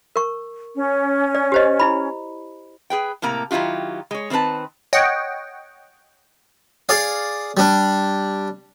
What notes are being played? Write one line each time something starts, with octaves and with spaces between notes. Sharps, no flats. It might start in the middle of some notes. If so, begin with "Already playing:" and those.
A#4 C#6
C#4
D5
G4 C5 D#5
E4 B5
G#4 B4 G5
A2 C3 A#3 A#5
D#3 F#3 E4 F4 G4
G#3 C#5
D#3 C4 D#4 B4 A5
C#5 D#5 F#5 G5
G#4 D5 F5
G3 D4